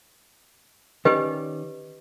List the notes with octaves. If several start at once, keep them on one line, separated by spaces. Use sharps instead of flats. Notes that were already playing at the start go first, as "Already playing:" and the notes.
D#3 C#4 G4 B4 D5 D#5